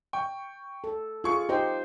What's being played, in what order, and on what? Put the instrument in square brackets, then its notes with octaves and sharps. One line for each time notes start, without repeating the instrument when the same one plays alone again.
[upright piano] G5 C#6
[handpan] A4
[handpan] F4 [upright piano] G#4 C#6 C#7
[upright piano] D#4 G5 [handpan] G4 C5